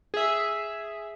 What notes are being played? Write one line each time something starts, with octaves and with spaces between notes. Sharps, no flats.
G#4 E5